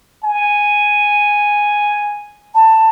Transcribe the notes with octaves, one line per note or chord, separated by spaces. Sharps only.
G#5
A5